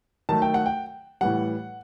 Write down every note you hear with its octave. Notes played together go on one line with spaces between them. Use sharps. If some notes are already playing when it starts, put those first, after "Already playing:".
D#3 F#3 A3 A5
G5
F#5
G5
A2 E3 G3 F#5